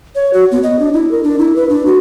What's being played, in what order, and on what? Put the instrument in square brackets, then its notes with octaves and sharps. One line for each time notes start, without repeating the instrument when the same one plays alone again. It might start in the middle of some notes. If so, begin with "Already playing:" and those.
[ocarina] C#5
F#4
B3
D#5
D4
E4
A#4
D4
E4
B4
D4
F#4